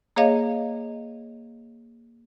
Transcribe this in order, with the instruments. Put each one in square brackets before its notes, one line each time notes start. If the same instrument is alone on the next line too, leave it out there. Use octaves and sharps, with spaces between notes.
[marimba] A#3 G#4 C#5 D#5 F5